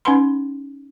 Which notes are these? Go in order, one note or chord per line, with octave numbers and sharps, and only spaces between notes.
C#4 D#4 B4 F#5 B5 C6